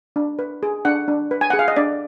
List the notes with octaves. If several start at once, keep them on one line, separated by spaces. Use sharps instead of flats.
D4
B4
G#4
D4 F#5
D4
B4
G#5
G#4 F#5
F5
D#5
D4 D5